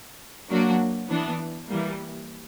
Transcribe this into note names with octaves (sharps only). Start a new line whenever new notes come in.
F#3 A#3 D4 F#4
E3 B3 D4
E3 G3 A#3